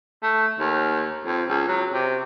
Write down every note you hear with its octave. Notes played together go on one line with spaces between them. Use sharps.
A3
D#2
F2
C#2
F#3
C3